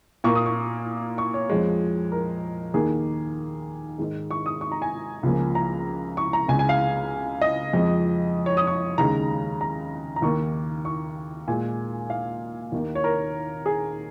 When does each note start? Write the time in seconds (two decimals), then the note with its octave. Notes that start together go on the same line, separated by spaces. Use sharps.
0.24 A#2 A#3 C#6
0.35 D#6
0.46 C#6
1.18 C#6
1.34 C#5
1.50 F2 F3 G#3
2.12 A#4
2.74 D#2 D#3 A#3 G#4
3.98 G#2 D#3 G#3
4.31 C#6
4.46 D#6
4.61 C#6
4.72 A#5
4.82 G#5
5.23 C#2 C#3 F3 A#3
5.55 A#5
6.17 C#6
6.33 A#5
6.48 C#2 C#3 G#3 G#5
6.59 G#5
6.69 F5
7.41 D#5
7.73 F2 F3 G#3
8.46 C#5
8.57 D#6
8.67 C#6
8.98 D#2 C#3 G#3 A#5
9.61 A#5
10.16 A#5
10.22 D#2 D#3 A#3 C#6
10.85 C#6
11.48 A#2 G#3 G#5
12.10 F5
12.72 D#2 D#3 A#3
12.95 C#5
13.04 A#4
13.66 G#4